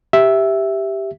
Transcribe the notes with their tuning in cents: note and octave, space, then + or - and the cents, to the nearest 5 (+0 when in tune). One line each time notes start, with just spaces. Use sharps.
G4 +0 E5 +0